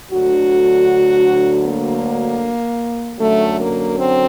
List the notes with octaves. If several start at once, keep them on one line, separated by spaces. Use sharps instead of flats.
D2 D3 F#3 F#4
A#3
F#2 D3 F#3 A3
A#3
C4